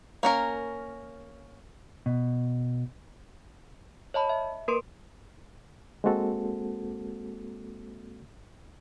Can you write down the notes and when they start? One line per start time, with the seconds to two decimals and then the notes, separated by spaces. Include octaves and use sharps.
0.23 A#3 C#4 A#4
2.06 B2
4.14 C#5 D#5 A5 B5
4.29 E5
4.68 A#3 A#4 B4 C6 D7
6.04 G#3 A#3 C4 F#4 A4